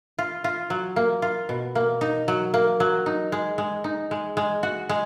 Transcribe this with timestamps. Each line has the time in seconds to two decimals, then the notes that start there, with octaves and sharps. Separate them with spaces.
0.19 F4
0.44 F4
0.70 F#3
0.96 A#3
1.22 F4
1.49 B2
1.75 A#3
2.01 D#4
2.28 F#3
2.54 A#3
2.80 F#3
3.06 D#4
3.32 G#3
3.58 G#3
3.84 D#4
4.11 G#3
4.37 G#3
4.63 F#4
4.89 G#3